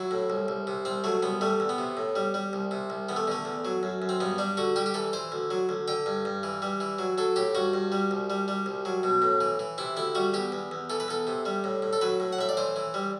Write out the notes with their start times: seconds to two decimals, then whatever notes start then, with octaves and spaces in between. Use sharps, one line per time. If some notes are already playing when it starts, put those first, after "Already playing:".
Already playing: F#3 E4
0.11 A2
0.30 C2
0.48 C2
0.67 C3
0.85 C2 C4
1.04 F#3 A3
1.23 C2 B3
1.41 G3 A3
1.60 E2
1.69 B3
1.78 C3
1.97 A2
2.16 G3
2.34 G3
2.53 C2
2.71 C3
2.90 C2
3.09 E2 B3
3.16 A3
3.27 D3 A3
3.45 E2
3.65 F#3
3.83 F#2
4.02 F#2
4.09 C4
4.20 G2 B3
4.38 G3 D4
4.57 D3 F#4
4.76 G3 G4
4.86 G4
4.94 E3 A4
5.13 E3 C5
5.32 D2
5.51 F#3
5.69 D2
5.88 D3 G5
6.06 G2
6.25 G2
6.43 E3
6.62 G3
6.80 E3
6.99 F#3
7.18 F#3 A4
7.36 A2 G4
7.55 G2 F#4
7.74 G2
7.92 G3
8.11 C2
8.30 G3
8.48 G3
8.66 C2
8.85 F#3
9.03 B2
9.22 A2
9.41 E3
9.59 E3
9.78 C3 E4
9.96 D2 E4
10.15 G3 F#4
10.34 E2 G4
10.52 E2
10.71 E2
10.90 E3 A4
11.00 B4
11.08 E2 A4
11.27 C3
11.45 G3
11.64 A2
11.82 A2
11.93 A4
12.01 F#3 B4
12.20 A2
12.33 F#5
12.39 A2 E5
12.49 D5
12.57 E3 C5
12.76 E3
12.94 G3